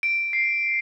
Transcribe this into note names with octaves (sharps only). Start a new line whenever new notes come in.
D7
C7